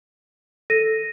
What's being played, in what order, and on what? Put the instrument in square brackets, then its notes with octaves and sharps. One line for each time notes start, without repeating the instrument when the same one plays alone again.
[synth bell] A4 [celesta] A#6 D#7